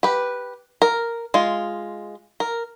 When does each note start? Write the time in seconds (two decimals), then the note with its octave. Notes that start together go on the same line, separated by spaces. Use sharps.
0.03 G4 B4
0.82 A#4
1.34 G#3 F4
2.40 A#4